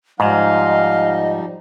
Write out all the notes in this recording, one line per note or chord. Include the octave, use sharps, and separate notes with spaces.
G#2 F3 G3 D#4 D#5 F5